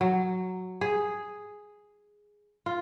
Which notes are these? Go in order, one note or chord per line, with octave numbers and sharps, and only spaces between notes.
F#3
G#4
F4